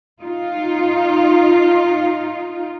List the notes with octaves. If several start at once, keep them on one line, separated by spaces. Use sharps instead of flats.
D#4 F4